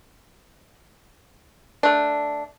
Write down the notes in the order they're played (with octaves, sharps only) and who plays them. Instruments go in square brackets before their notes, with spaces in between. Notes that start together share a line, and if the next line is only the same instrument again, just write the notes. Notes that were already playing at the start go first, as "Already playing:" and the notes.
[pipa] A3 D4